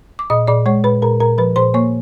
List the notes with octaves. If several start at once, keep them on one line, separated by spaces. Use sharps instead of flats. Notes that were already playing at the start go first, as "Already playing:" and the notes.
D6
A#2 D#5 D#6
A#2 D5 D6
G#3 C#5 C#6
A#2 B4 B5
A#2 A#4 A#5
A#2 A#4 A#5
F3 B4 B5
A#2 C5 C6
A#3 C#5 C#6